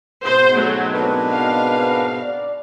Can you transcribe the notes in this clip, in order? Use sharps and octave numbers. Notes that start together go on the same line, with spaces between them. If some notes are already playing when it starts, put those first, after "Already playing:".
G#2 B2 C4 C5
F#3 A3
D4 A#4 B4
F5
D5